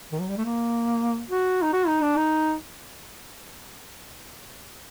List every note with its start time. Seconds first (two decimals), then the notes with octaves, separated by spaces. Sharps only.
0.12 D#3
0.21 F#3
0.29 G3
0.38 A3
0.45 A#3
1.30 F#4
1.62 D#4
1.73 F#4
1.87 D#4
2.01 D4
2.16 D#4